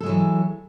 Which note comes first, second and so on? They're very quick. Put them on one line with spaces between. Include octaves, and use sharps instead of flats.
A4 G#3 F#3 E3